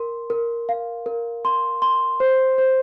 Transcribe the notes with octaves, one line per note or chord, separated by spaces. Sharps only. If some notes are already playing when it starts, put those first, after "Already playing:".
Already playing: A#4 C6
A#4
F5
A#4
C6
C6
C5
C5